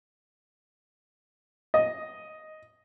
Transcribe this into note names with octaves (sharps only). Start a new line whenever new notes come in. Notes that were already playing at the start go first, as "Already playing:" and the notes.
D#5